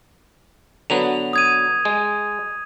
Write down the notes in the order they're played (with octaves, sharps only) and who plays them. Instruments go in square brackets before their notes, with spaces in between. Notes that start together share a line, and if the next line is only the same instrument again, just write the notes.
[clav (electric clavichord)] D3 F#3 B3 [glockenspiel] F7
[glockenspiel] D#6 G#6 D#7
[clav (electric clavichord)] G#3